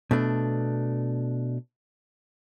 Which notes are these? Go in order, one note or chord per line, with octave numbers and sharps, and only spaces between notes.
B2 A3 D4